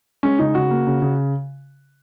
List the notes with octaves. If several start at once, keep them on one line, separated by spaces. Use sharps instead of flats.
G#3 C#4
C#3 D#4
C#3 F#4
A#3
C#3
C#3